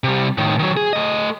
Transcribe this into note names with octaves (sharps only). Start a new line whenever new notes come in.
C3 G3
A2 D#3
D#3 F#3
G#4
A3 D#5